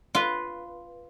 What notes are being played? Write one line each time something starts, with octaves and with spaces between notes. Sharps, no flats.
F4 B4